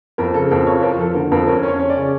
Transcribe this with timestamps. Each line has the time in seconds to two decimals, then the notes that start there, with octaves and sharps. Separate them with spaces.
0.18 F2 A#4
0.34 C#3 A4
0.51 F2 A#4
0.67 F3 C#5
0.82 F3 A#4
0.98 F3 A4
1.14 D3 A#4
1.32 F2 A#4
1.47 C#4 A#4
1.63 C#4 C#5
1.79 C#4
1.90 D5
1.95 C#3